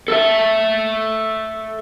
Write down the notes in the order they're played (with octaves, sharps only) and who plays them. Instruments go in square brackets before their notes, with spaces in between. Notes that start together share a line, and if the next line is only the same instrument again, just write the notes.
[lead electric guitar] A4 E5